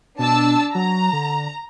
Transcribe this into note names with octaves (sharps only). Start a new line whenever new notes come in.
B2 D4 A5 E6
F#3 A#5
D3